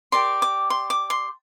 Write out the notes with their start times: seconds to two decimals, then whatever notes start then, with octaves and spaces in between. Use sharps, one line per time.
0.12 G4 A#4 D5 C6
0.42 D6
0.70 C6
0.90 D6
1.10 C6